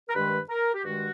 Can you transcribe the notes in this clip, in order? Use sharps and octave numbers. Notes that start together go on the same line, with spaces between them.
A#4
G2 D#3 G#3 B4
A#4
G4
G2 D#3 G#3 F#4